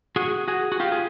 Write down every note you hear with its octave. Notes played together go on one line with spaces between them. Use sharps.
F#4 G#4
F#4 G#4
F#4
F4 G4
G#4